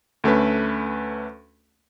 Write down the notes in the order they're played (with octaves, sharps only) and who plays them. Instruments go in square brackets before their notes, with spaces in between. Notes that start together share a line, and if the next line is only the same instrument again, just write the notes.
[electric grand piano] D2 A3 C#4 B4